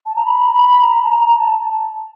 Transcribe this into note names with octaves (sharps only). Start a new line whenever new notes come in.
A5
A#5
B5
A#5
B5
A#5
A5
A#5
A5